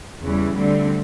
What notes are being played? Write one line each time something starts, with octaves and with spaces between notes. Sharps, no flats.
E2 C#3 E3 G3
D2 D3 G3 C4